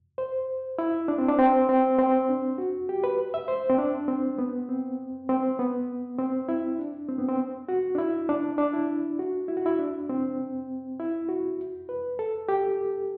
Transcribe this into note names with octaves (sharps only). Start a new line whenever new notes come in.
C5
E4
D4
C4
D4
C4
C4
C4
D4
F#4
G4
B4
E5
C5
C4
D4
C4
B3
C4
C4
B3
C4
E4
D4
C4
B3
C4
F#4
D4
E4
D4
D4
E4
F#4
E4
F#4
E4
D4
C4
E4
F#4
B4
A4
G4